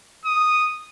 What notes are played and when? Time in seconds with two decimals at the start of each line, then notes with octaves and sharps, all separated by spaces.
0.25 D#6